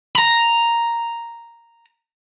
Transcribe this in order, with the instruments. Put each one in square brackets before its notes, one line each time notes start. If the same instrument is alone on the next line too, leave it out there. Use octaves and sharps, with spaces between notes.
[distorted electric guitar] A#5 B5